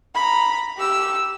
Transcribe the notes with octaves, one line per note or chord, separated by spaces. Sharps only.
A#5 B5
G4 E6